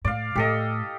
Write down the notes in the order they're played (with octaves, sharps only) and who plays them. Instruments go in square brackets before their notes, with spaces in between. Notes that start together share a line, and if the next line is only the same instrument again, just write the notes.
[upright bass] A2 [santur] D5 F5
[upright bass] A2 [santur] G4 A4 D#5